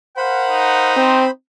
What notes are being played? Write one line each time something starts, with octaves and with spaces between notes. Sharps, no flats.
A#4 C5 F5 F#5 B5
D#4
C4